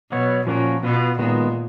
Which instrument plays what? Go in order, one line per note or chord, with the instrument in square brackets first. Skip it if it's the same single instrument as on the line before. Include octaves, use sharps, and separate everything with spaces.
[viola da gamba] B2 [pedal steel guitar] F#3 B3 F#4 C#5
[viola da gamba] A#2 [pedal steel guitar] F3 A#3 C#4 F#4 A#4
[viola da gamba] B2 [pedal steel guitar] B3 F4 B4
[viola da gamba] A#2 [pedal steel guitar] D#3 G#3 B3 F#4